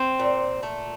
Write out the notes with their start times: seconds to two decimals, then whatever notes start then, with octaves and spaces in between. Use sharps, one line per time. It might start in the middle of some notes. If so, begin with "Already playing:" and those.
Already playing: C4
0.19 A#2
0.63 A3